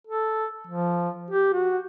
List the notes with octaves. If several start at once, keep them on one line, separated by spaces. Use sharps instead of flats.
A4
F3
G4
F#4